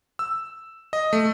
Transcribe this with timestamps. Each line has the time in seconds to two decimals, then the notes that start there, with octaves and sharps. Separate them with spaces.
0.19 E6
0.93 D#5
1.13 A3